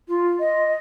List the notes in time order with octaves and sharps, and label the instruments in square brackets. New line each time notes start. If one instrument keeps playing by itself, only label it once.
[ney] F4
D#5